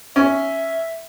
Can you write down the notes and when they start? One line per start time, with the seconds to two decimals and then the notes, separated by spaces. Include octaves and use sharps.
0.16 C#4 E5